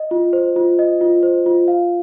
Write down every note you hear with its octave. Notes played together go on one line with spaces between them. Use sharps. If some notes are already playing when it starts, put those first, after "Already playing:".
Already playing: D#5
F4
C5
F4
D#5
F4
C5
F4
F5